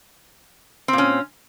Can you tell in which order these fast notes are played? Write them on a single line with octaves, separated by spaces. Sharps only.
C4 A#2 C#4